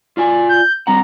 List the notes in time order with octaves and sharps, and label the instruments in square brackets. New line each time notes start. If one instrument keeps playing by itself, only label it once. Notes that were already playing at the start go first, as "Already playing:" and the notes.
[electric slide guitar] F4 D5 G#5
[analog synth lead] G6
[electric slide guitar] G3 C4 F#5 [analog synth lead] A#5